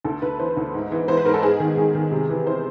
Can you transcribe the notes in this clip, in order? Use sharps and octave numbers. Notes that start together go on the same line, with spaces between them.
D2 A4
D2 B4
E3 C5
D2
G#2
E3
E3 C5
B4
G#2 A#4
A4
G#2 G#4
D#3
D#3
D#3
C3
E3
E3 C5